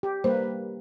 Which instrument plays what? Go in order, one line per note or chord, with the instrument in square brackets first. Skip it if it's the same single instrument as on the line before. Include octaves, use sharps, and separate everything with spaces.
[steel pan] G4
[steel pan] G3 A#3 B4 [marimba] C5